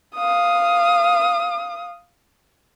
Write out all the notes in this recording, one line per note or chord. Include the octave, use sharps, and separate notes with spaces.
F5 D#6